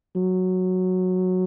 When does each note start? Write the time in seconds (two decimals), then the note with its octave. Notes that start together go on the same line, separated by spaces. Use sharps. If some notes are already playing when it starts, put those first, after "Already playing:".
0.16 F#3